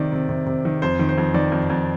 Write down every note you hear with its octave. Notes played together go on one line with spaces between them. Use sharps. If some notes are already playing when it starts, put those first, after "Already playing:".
Already playing: C3 D#3 D5
C3
C3
C3
D#3
F2 C5
D#3
C5
F2
D#3 D5
F2
F2